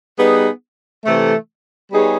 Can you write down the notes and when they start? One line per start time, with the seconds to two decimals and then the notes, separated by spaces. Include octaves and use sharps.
0.17 G3 B3 D#4 G#4 B4
1.05 C3 E3 A3
1.92 G3 B3 D#4 G#4 C#5